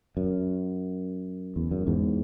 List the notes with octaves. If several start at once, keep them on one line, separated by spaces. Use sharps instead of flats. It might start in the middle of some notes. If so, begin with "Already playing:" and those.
F#2
E2
F#2
E2 G#2